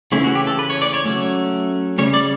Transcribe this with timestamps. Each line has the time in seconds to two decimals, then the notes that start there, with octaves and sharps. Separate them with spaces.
0.12 C#3 E3 A3 C#4 E4
0.24 F#4
0.35 G4
0.47 A4
0.59 B4
0.70 C#5
0.82 D5
0.94 C#5
1.05 F#3 A3 C#4
1.98 C#3 G3 C#4 C#5
2.14 D5